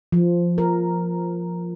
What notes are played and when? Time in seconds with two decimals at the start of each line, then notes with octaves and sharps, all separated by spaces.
0.12 F3
0.58 A#4